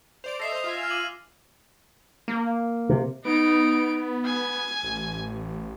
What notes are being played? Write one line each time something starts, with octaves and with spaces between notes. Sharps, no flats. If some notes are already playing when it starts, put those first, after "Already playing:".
C5 D5 D7 F7
A4 D#5 E5 A#6 C7 F7
C5 D#5 F7
F4 E5 G#5
F6 F7
D6 D#7 F#7
A#3
C3
B3 D#4 D7
G#5
A1